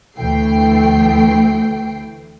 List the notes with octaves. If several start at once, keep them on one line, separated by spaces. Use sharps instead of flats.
D2 E3 A3 G5 C7